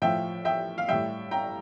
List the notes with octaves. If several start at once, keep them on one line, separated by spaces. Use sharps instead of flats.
A2 F3 E5 G5
E5 G5
F5
A2 G3 E5 G5
G5 A#5